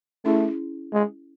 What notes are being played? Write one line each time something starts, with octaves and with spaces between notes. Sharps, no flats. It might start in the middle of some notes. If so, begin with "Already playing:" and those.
A3 C#4 E4 G#4
G#3